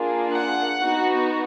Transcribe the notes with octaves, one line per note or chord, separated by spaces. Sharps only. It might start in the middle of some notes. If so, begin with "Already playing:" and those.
Already playing: A#3 D4 F4 G#4
F#5
B3 D#4 F#4